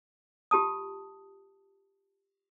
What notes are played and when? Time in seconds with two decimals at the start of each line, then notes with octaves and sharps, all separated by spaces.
0.51 F4 G4 A5 D#6